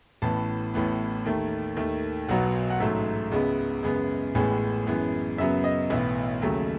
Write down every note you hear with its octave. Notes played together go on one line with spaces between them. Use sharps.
A1 A2 E3 B3 A5
A1 A2 E3 B3
D#2 D#3 A3
D#2 D#3 A3
B1 B2 F#3 B3 F#5
F#5
A1 G#2 F#3 A3 E5
C#2 C#3 G#3 B3
F#2 C#3 G#3 B3
A1 A2 G#3 B3 G#5
F#2 E3 G#3 B3
F#2 C#3 F#3 B3 E5
D#5
B1 A2 E3 B3 E5
D#2 C#3 F#3 A3